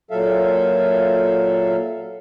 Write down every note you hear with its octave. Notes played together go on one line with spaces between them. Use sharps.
A#2 F#3 A4 E5 F5